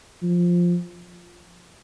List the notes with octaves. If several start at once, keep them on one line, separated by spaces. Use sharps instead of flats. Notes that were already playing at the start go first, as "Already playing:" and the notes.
F3